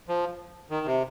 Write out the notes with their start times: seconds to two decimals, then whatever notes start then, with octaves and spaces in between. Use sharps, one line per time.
0.08 F3
0.70 D#3
0.86 C3